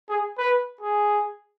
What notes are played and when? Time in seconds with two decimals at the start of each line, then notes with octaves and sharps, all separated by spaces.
0.09 G#4
0.38 B4
0.81 G#4